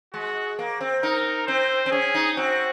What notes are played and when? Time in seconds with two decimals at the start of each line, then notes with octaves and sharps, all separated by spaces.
0.13 G#3 F#4
0.59 A#3
0.81 C4
1.03 D#4 A#4
1.47 C4 C5
1.86 C4
1.91 C#4 G#4
2.15 D#4
2.37 C4 F#4